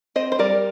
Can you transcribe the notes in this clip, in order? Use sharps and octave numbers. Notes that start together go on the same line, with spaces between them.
C4 C5 D#5
C5
G3 A#4 D5